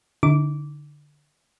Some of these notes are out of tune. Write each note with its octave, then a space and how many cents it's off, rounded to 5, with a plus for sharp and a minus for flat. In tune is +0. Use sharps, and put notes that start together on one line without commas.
D3 +0 D#4 +45 D6 -15